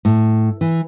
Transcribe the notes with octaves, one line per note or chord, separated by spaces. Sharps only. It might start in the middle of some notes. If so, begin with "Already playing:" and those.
A2
E3